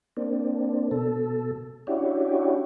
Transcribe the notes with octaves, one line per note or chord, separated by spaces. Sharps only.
A#3 C4 D4
B2 A4
C#4 D4 E4 F#4 G4